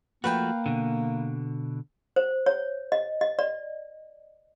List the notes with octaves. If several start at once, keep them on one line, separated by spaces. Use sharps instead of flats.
F3 A3 A#3 F#4 B4 F5 G5
B2 D3
C5
C#5
D#5
D#5
D5